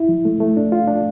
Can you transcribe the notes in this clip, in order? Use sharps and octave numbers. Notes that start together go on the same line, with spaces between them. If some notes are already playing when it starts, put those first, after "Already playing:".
Already playing: E4
F3
A3
A3
D4
F4
D4